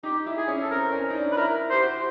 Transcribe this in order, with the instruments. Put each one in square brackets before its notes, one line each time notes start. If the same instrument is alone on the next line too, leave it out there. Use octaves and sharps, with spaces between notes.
[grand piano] D#4 [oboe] G4
[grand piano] E4
[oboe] G#4
[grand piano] C#4
[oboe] A4
[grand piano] C4 [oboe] A#4
[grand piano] C#4
D#4
D4
[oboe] B4
[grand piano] E4 [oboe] A#4
[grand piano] G4 [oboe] C5
[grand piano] F#4